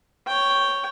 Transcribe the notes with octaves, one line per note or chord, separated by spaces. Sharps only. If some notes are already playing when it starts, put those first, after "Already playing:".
C#5 G5